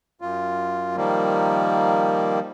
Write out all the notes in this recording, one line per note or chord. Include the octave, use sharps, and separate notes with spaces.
F#2 F4
D#3 F3 G3 A#3